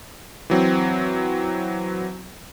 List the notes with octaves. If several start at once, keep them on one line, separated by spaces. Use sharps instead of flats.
E3 F#3 C4